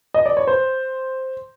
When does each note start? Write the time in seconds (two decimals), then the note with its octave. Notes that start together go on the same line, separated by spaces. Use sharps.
0.14 D#5
0.26 D5
0.37 C#5
0.47 C5